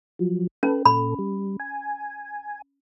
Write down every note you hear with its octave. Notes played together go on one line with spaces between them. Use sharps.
F3 F#3
C#4 A4 B4
A#2 A4 B5
G3
G#5